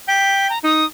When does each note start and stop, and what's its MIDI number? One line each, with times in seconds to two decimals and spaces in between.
0.08 0.50 79
0.08 0.48 95
0.50 0.59 82
0.64 0.84 63
0.64 0.85 87